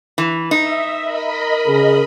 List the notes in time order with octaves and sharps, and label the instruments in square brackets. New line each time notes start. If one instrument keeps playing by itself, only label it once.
[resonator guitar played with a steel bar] E3
[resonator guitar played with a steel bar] D#4 [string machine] E5
[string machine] A#4 D#5 B5
[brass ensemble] C#3 G#4